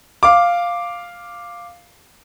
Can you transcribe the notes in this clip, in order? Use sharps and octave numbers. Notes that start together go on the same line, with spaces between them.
F5 D6